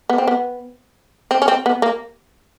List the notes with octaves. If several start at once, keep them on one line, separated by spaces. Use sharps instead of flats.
B3
C4
B3
C4
C#4
C4
B3
A#3